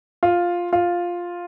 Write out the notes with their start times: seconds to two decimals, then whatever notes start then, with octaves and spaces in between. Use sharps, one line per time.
0.23 F4
0.73 F4